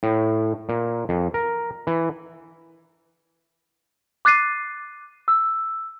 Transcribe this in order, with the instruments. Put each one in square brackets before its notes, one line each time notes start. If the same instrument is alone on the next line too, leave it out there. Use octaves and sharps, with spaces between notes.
[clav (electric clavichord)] A2
A#2
F2
A#4
E3
[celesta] D6 F#6 A6 C7 D#7
E6